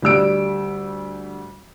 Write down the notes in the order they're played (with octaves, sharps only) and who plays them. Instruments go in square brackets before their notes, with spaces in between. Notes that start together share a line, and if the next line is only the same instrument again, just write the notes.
[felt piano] D2 G3 E6 D7